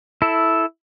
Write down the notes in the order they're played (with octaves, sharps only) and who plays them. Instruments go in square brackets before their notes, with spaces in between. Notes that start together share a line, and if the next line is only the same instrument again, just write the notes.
[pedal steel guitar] E4 A4